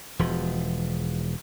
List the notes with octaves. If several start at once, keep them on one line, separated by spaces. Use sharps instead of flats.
E1 F3